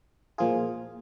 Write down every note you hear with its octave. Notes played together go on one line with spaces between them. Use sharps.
A#2 F3 A#3 F4 G#4